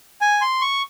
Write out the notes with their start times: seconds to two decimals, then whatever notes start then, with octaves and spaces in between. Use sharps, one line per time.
0.21 G#5
0.41 C6
0.61 C#6